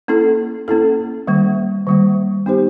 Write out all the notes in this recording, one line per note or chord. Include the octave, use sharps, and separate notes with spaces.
A#3 C#4 E4 A4
A#3 C#4 E4 A4
D#3 G3 A#3
D#3 G3 A#3
B3 D#4 G4 C5